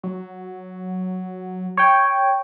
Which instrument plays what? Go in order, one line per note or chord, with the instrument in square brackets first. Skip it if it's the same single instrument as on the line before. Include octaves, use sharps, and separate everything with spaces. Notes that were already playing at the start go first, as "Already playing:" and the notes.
[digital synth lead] F#3
[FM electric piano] C#5 G5